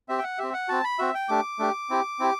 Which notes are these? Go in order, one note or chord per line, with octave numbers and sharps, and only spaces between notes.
C4 G4 E5
G5
F#5
C4 G4 E5
F#5
C4 F#4 A5
B5
C4 F#4 E5
G5
A3 D4 G4 D6
A3 D4 G4
C4 E4 G4
C4 E4 G4